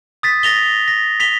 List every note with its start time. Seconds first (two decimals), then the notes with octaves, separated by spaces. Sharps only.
0.23 D#6 A6 B6
0.43 A6 A#6 F7 G7
0.88 A#6
1.20 B6 F7 G7